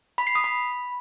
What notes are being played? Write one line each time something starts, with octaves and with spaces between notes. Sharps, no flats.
B5
C7
D#6
B5